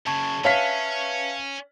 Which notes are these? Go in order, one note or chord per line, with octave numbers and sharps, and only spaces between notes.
F#2 C#3 A5 C#6 G#6
C#4 B4 C#5 E5 F5 A5 B6